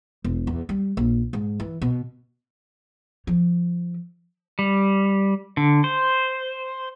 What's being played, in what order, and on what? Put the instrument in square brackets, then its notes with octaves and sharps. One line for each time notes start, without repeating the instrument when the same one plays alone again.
[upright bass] E1
E2
G3
A#1
G#2
E3
B2
F3
[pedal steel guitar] G3
D3
C5